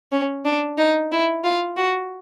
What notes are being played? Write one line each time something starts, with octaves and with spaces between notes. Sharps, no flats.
C#4
D4
D#4
E4
F4
F#4